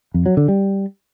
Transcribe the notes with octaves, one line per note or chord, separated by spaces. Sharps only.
F2
F#3
D3
G3